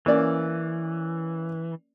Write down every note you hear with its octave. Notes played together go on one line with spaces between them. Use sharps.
E3 A#3 C#4 D5